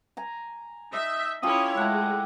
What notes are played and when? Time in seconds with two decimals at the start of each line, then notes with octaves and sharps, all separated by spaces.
0.17 G#5 A#5
0.93 D#4 D#5 E5
1.43 C#4 E4 F4 G4 A4 C#5 D#6
1.77 G#3 A3 E4 F#5